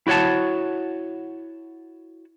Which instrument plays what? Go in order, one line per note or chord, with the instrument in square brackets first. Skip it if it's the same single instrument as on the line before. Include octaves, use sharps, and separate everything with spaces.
[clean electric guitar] E4 F#4 C#5 F#5 A5